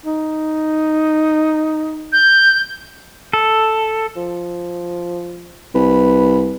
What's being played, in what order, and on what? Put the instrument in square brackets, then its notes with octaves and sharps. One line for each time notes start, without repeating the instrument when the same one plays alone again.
[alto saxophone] D#4
[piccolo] G6
[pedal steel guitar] A4
[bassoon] F3
[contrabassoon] C2 [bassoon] B4